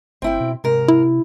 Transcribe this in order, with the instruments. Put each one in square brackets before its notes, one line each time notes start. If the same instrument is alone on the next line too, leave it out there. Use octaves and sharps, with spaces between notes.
[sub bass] G1 [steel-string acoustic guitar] C4 E4 G5
[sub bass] B2
[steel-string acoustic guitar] G#2 A#4 [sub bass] C3
[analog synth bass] E4